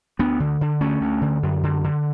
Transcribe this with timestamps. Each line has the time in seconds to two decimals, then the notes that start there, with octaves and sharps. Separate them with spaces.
0.19 D2 B3 D4
0.40 D3
0.61 D3
0.81 D2 A3 C#4
1.01 D2
1.21 D3
1.43 F#2
1.63 D3
1.84 D3